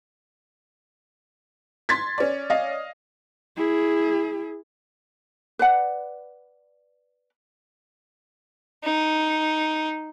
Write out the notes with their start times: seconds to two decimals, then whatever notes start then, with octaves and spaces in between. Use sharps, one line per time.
1.89 C6 G#6 A6 B6
2.18 C#4 D5
2.50 D#5 F5
3.57 E4 G#4
5.59 B4 D5 F#5
8.84 D#4